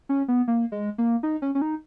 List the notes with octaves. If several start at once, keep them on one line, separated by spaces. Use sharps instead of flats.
C#4
B3
A#3
G#3
A#3
D#4
C#4
C#4
D#4